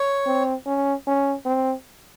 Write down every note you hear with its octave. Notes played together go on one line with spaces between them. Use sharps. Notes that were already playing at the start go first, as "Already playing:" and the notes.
Already playing: C#5
C4
C#4
C#4
C4